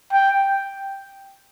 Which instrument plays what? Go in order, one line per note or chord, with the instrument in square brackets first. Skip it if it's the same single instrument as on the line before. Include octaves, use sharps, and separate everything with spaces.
[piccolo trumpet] G5